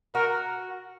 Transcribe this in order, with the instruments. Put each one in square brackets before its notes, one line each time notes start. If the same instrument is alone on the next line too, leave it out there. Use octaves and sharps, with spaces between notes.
[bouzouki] F#4 [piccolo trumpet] A#4